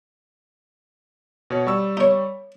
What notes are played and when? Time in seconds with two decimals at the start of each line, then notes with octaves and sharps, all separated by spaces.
1.50 B2 C#5
1.67 G3 C#6 E6
1.97 D#4 C#5